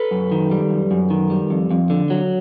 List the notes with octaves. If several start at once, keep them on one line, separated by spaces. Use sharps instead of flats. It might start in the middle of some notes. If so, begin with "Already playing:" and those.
Already playing: A4 B4
F#2
D#3
G3
F#2
F#2
D#3
G3
F2
F2
D3
F#3